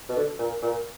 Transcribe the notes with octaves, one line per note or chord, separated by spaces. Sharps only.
B2
D3
A#2
A#2